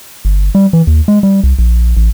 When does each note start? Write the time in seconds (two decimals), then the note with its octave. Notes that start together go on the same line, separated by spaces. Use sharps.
0.25 G1
0.55 G3
0.73 E3
0.87 D#2
1.08 G#3
1.23 G3
1.43 C2
1.59 A#1
1.97 A1